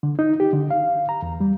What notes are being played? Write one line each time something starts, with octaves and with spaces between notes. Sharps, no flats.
D3
D#4
G4
D3
F5
A#5
E2
G3